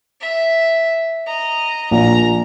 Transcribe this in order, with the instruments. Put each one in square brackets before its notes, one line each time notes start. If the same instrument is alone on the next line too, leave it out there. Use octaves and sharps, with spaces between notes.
[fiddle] E5
D#5 A#5
[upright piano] A#1 [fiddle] A#5